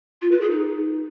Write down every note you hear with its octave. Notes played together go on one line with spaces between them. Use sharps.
F4
B4
G#4
D#4